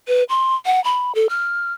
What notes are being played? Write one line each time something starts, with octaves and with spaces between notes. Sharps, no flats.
B4
C6
F#5
B5
A4
F6